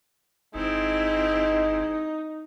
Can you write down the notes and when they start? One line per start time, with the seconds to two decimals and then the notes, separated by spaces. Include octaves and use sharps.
0.55 G1 G#3 C4 D#4 E4